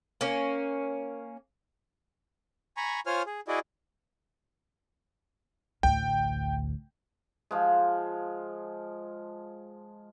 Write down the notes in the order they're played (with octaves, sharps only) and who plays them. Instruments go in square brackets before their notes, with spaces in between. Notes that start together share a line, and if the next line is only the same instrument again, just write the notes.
[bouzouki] A#3 C#4
[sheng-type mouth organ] G#5 A#5 B5 C#6
F4 C5 C#5 G#5 F6
G#4
E4 F#4 G#4 D5 D#5
[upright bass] A1 D2 [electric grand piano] G5
[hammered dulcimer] F3 G#3